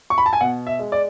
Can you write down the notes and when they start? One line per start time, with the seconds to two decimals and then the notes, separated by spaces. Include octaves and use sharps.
0.10 C#6
0.18 B5
0.26 A5
0.33 G#5
0.40 B2 F#5
0.67 E5
0.79 G#3
0.92 D5